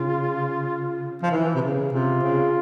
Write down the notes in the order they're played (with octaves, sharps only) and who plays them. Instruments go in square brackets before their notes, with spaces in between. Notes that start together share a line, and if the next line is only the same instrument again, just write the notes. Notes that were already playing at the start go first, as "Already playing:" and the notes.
Already playing: [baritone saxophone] C#3 [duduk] F4
[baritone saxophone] F3
E3
C3
C#3
[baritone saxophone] C3 [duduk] F4
[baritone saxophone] C#3